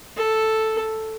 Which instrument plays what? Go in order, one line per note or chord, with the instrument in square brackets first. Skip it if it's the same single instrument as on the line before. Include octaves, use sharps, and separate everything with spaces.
[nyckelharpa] A4